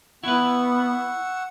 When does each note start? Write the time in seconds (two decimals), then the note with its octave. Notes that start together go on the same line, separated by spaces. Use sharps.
0.24 B3 E4 B4 F#5 C#6 E6